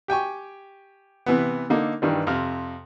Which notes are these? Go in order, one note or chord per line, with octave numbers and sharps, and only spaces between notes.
G4 G5 G#5 C#6
C3 E3 B3
D3 A#3 D#4 A4
G2 D#3 E3 G3
F2 C3 F6